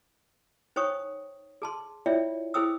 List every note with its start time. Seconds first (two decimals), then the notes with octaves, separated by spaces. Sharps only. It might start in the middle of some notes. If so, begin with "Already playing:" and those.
0.76 D#4 C5 C#5 G5 C#6 D#6
1.62 G#4 A5 C6
2.06 E4 F4 C#5 D5 E5 G5
2.54 E4 G#4 C5 G5 D#6 E6